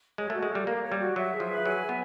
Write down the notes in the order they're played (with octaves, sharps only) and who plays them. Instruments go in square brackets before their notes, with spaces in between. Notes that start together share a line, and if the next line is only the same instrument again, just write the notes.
[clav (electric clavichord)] G#3 [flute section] C#5
[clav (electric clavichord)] A3
[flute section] F#4
[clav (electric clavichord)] G#3
[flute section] A4
[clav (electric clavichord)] G3
[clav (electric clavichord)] A#3 [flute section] F5
[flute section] C#5
[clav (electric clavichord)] G3
[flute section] F#4
[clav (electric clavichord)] F#3 [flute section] E5
[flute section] G#4
[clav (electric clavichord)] F3
[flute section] B4
[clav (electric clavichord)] F#3 [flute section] G#5
[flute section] E5
[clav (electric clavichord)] B3